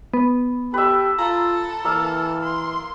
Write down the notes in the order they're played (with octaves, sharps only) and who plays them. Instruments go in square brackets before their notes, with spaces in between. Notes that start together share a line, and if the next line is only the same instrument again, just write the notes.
[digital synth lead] B3
[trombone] G4 [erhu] A4 [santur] B4 E5
[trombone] F4 [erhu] A4 [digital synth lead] A#5
[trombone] E3 [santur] A#3 E5 F5
[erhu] C6